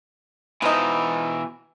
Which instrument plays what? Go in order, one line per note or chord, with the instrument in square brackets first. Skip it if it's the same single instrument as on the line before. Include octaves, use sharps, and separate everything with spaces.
[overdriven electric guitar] B2 E3 [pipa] F3 D#4